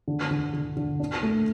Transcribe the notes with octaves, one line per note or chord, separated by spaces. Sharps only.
D3
D3
D3
D3
D4
A3